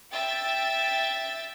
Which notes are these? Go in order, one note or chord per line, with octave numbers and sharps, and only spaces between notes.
E5 G5 A6